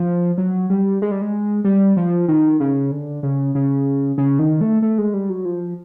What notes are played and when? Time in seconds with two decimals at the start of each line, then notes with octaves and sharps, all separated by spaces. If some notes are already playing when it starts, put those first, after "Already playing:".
Already playing: F3
0.38 F#3
0.70 G3
1.02 G#3
1.11 G3
1.22 G#3
1.64 G3
1.97 F3
2.28 D#3
2.60 C#3
2.91 D3
3.23 C#3
3.55 C#3
4.18 C#3
4.39 D#3
4.61 A3
4.82 A3
4.98 G#3
5.14 G3
5.30 F#3
5.45 F3